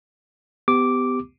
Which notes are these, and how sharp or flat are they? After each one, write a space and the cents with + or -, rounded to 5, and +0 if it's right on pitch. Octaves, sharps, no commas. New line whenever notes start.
B3 +30 G4 +0 D6 -5